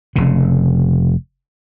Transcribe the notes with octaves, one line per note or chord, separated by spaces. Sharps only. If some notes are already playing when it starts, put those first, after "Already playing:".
F1 C#3